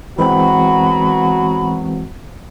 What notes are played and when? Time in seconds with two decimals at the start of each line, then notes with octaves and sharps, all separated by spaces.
0.19 E3 F#3 G#3 B3 C4 F#4 B5